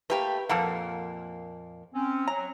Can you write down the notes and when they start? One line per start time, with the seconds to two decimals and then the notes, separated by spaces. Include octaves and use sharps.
0.10 A3 A#3 G4 B4
0.49 F2 A#2 A#3 A4 A#4 F#5
1.94 C4 C#4
2.28 F#3 A#5